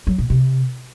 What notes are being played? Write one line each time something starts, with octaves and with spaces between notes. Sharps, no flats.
F#3
A#2
C3